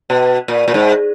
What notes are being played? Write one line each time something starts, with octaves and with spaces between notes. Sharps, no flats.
B2
A#2
A#2
G#2